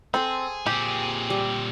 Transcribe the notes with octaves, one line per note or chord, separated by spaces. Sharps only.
C4 G#4 A4 C5
A#2 C4 G4
G3